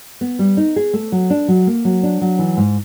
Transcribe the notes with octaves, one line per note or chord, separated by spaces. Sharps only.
B3
G3
D#4
G#4
A3
F#3
D4
F#3
A#3
F#3
D4
F#3
E3
G#2